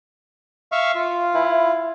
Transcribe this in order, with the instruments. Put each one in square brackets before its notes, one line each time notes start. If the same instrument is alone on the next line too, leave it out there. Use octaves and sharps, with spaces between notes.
[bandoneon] E5 F5 C#6
F4
[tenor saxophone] E4